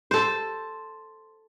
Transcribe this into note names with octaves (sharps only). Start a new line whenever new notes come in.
A4 C5